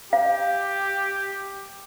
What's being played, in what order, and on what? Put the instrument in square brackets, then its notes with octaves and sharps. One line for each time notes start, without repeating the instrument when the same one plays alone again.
[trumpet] G4 [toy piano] F5